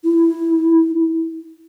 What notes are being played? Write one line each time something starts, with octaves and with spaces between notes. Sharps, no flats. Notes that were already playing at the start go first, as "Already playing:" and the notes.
E4